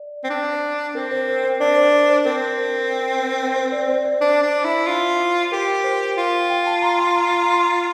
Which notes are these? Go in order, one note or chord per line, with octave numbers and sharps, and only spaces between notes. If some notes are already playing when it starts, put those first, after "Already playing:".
Already playing: D5
C4
D4
C4 A#4
C5
C5
C5
D4 D5
C5
D5
C5
C4 A#4
C5
D5
C5
D5
D4 C5
D4
E4
F4
G4 A#4
C5
F4
G5
A5
A#5
C6
A#5
C6
A#5
C6